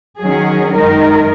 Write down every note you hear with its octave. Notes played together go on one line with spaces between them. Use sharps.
D#3 F#3 C#4 G#4
F#2 D#3 G#3 D#4 A#4